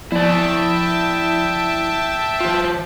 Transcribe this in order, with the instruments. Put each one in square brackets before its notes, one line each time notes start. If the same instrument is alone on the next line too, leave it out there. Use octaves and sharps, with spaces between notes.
[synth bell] F3 [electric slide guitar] E4 D5 [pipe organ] E5 G5 A5
[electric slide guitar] E3 F4